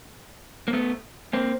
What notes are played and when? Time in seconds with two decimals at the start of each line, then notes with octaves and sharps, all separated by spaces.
0.68 A#3
0.73 A3 B3
1.33 A#3 C4